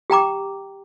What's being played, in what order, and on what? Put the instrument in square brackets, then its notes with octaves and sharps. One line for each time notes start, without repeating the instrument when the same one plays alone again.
[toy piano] G4 G5 A#5 D6